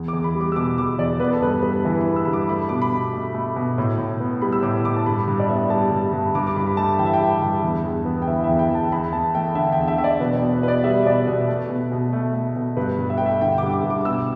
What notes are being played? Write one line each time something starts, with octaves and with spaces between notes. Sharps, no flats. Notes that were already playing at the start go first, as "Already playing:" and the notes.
Already playing: E2
D6
E2
B5
G3
D6
E6
B2 D6
E2 D6
E2 D5
B3 B4
A4
G2 B4
G3 B4
E3 B4
B5
B3
E6
G2 B5
D6
A3 B5
B2 D6
B5
B2
A3
A3
B2
A2
A2
B3
G3 B5
E6
A2 D6
A2 D6
A5
G2 B5
G2
D5
B3 E5
G3 A5
G2
G2
G2 D6
D6
G2 B5
B5
A3 A5
E3 G5
E5
G5
G2
G2
E2
E2
B3
G5
E3 E5
E5
E2
G5
E2
A5
E2 B5
E2 A5
A3 G5
D3 E5
G5
E2
E5
E2 E5
D5
B2 B4
D5
B2
B4
B3 B4
D5
G3 E5
B2 D5
B2 B4
A3
B2
B2
A3
A3
B2
G2 B4
G2
E5
A3 G5
E5
D3 G5
D6
G2
D6
G2
D6
D6
B2 E6